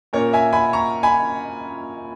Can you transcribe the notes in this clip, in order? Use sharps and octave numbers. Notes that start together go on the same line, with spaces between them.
A#2 A#3 C#4 A#4 C#5
E5 G#5
G#5 B5
A#5 C#6
G#5 B5